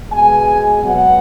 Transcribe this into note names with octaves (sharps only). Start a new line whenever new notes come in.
B2 G#3 B3 G#5
B2 F#3 B3 F#5